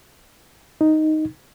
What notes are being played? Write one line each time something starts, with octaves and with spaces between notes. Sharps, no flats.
D#4